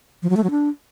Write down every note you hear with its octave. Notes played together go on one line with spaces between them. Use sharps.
F3
F#3
A3
F#3
D4